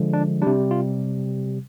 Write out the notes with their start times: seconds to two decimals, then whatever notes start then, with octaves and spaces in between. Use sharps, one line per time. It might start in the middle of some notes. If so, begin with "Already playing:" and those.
Already playing: D3 F3 G#3
0.13 D4
0.42 C3 G3 D4
0.71 F4